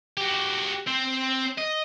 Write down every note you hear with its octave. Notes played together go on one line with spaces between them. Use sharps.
F#4 G4
C4
D#5